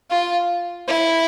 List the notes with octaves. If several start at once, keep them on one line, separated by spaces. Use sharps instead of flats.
F4
E4